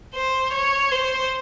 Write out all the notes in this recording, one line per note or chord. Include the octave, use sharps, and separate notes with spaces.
C5
C#5
C5